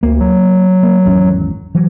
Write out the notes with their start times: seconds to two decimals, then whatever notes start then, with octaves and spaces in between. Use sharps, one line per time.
0.03 D2 A#3
0.20 F#3
0.83 A#3
1.06 G#1 E2 C#4
1.75 E3 F#3